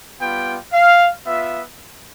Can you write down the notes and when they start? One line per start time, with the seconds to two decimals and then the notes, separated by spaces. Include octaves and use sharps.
0.20 G3 B3 F4 G5
0.73 F5
1.25 B3 F4 E5